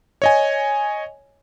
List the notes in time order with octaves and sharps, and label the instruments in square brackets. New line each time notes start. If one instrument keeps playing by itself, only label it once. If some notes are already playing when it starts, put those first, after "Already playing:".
[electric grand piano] C#5 D#5 G#5